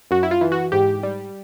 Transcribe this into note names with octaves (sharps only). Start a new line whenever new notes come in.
F#2 F#4
E4
F4
E3
F#4
G#2 G4
G3